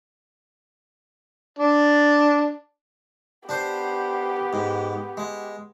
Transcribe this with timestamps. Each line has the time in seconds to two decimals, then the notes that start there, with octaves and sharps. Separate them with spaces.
1.59 D4
3.49 B3 D4 G4 C5
4.53 G#2
5.17 G#3